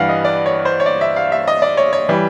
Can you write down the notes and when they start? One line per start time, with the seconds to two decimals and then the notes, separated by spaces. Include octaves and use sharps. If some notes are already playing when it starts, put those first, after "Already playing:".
Already playing: G2 E3 G3 F5 F#5
0.09 D#5
0.25 D5
0.46 C#5
0.65 C5
0.80 C#5
0.86 D5
1.01 E5
1.16 F5
1.32 E5
1.48 D#5
1.62 D5
1.77 C#5
1.93 C#5
2.09 E3 G3